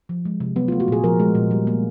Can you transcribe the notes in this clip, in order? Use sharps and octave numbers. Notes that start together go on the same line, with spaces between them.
F3
G#3
C3
F#3 B3
F4
A3
F#4
A#2 G#4
F3 A#4
G#3
A#2
G3
A#3